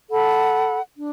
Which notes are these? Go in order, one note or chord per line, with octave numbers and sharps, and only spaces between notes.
A4 F#5 B5
D4